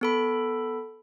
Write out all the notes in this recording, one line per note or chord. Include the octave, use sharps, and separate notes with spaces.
B3 A4 B5